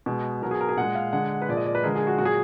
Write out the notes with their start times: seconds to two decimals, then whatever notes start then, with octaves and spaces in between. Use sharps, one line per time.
0.06 B2 G#3
0.42 B2 F#3 A#4
0.51 G#4
0.61 A#4
0.69 G#4
0.77 A#2 G#3 F#5
0.95 F5
1.13 D3 G#3 F#5
1.42 B4
1.48 A#2 F3 G#3 D5
1.57 D#5
1.66 D5
1.75 B4
1.84 D3 F3 G#3 A#4
1.96 G#4
2.07 F#4
2.18 A#2 F#3 F#4
2.25 G#4